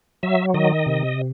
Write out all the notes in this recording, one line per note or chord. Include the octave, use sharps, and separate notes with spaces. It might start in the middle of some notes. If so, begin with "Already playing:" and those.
F#3 E5
D#3 D#5
C3